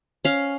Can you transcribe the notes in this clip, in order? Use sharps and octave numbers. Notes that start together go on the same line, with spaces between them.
C#4 F5